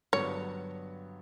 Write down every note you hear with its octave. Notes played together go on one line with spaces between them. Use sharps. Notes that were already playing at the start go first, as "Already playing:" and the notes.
G2 D3 F#3 B3 D4 C#5